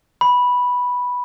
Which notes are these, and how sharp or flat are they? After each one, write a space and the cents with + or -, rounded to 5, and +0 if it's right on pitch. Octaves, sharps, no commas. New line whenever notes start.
B5 -5